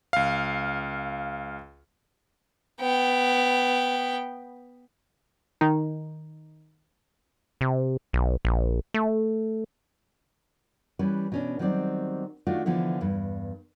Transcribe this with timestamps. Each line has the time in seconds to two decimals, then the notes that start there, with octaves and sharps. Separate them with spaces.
0.13 C#2 F5
2.81 B3 G5
5.61 D#3 D#4
7.61 C3
8.13 B1
8.45 A#1
8.94 A3
10.99 E3 G3 C#4 B4
11.32 B2 C#4 D4
11.59 D#3 F#3 G3 C4 D5
12.47 D#3 A3 D4 F4 F#4
12.66 D3 E3 F3 B3 E4
13.01 E2 G2